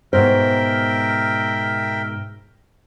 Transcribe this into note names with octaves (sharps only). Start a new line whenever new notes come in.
G#2 B2 A#4 C5 E5 G5